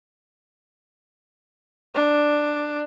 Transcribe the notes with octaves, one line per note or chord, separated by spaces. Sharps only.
D4